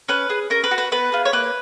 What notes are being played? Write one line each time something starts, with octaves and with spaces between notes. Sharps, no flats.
C#4 B4
G#4
C#4 A#4
B4
F#4
B4
B3 B4
F4 G#4
C#5
A#3 B4